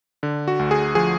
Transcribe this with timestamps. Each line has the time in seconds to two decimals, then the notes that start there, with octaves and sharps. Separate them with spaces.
0.23 D3
0.48 F#4
0.59 D2
0.71 G#4
0.95 F3 G#4